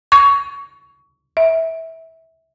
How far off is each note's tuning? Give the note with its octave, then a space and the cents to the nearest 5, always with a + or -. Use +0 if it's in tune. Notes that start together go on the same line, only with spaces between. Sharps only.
C#6 +20
E5 -20